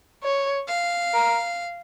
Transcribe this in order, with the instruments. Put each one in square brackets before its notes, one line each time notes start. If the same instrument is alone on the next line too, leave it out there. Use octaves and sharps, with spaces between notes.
[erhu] C#5
[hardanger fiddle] F5
[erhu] A#4